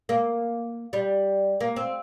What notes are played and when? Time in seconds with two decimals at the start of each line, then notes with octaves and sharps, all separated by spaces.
0.09 A#3
0.93 G3
1.61 A#3
1.76 C4